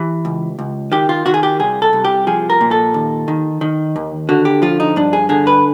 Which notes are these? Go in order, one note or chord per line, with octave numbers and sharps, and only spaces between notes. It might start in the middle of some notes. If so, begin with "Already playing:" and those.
Already playing: E3 G4
C#2
C#2
D#3 G4
F4
D#3 F#4
G#4
G4
C2 G#4
A4
C2
G4
F3 G#4
A#4
A#2
A4
D#2
D#3
D#3
D#2
D3 F#4
G4
F3 F4
D#4
G2 D4
G#4
D3 G#4
B4